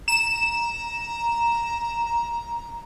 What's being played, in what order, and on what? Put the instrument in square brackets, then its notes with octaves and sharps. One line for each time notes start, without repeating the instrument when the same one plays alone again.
[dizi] A#5 [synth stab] E7